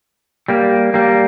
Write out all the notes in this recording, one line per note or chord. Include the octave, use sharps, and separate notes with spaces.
G3 A#3
G3 A#3